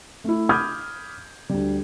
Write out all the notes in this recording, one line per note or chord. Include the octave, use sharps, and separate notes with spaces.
A3 E4
B5 D6 D#6 F6 G6 G#6
D2 G3